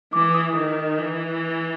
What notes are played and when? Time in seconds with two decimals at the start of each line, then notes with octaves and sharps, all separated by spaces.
0.13 E3 D6
0.34 D#6
0.56 D#3
0.98 E3